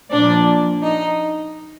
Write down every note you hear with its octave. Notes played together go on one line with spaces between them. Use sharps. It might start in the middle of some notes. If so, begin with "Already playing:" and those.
A#2 F3 A#3 D4 D5
D#4 D#5